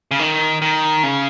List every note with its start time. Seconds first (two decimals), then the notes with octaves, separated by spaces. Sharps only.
0.11 C#3
0.19 D#3
0.62 D#3
1.03 C#3